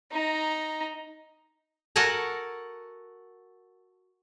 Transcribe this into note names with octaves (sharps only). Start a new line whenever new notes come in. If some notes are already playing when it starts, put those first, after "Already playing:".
D#4 A#5
F#4 A4 A#4 F#5 G#5 A#5